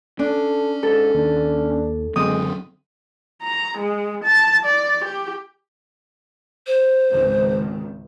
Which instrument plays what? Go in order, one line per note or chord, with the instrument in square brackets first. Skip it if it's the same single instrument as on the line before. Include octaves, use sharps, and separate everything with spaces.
[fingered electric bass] C#4 [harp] D4 [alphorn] A4
[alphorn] G#2 [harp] A4
[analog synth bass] D#2 [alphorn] D4
[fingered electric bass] F#1 D3 F#3 [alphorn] G#3 [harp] C4 D#6
[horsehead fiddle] A#5
G#3
A5
D5
G4
[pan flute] C5
[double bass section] G#1 C#2 D#3